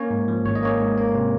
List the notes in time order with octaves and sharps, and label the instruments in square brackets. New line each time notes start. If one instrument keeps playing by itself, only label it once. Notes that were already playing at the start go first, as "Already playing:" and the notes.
Already playing: [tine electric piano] A#3 C#4 C#5
G#2
F3
G#1 C#5
D#5
A#3 C#4 C#5
G#2
A#3
C3